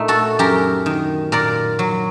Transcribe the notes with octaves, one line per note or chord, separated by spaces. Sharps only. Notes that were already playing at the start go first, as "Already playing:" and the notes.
Already playing: A#2 A3 D#4
F#4 A4
F#2 G4 A#4
D#3
A#2 A#4 D5
F#3